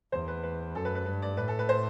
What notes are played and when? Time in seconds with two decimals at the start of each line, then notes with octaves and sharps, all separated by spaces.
0.12 E2 C5
0.28 B4
0.43 B4
0.75 F#2 A4
0.85 B4
0.95 B4
1.06 G2 B4
1.22 D5
1.37 A2 B4
1.48 A4
1.59 B4
1.69 C5